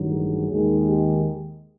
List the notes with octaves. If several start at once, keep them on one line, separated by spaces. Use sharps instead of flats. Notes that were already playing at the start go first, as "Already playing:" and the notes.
Already playing: A1 G2 D#3 F#3
G#4
D#2 D#3 G#3
G4